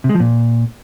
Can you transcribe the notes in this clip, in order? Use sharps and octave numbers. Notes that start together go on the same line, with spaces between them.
C3
G#3
F3
A#2